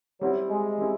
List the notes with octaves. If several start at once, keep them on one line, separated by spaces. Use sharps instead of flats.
F#3 G3 C4 E4
G#3
G3 C4 E4